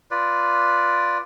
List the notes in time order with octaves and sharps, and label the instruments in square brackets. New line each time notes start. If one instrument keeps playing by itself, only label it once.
[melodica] F4 B4 D5